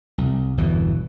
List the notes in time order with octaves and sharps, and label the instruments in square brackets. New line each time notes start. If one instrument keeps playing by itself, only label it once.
[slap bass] C2
G1 E2 B2 E3